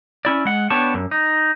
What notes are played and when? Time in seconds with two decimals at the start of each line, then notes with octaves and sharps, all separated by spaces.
0.25 C#4 E4 D5
0.45 G#3 F#5
0.70 B3 D4 G4 C#5 A5
0.94 F#2
1.11 D#4